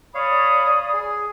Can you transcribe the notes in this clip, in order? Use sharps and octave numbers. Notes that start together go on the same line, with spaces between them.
C#5 D5 F5 B5 D#6
G#4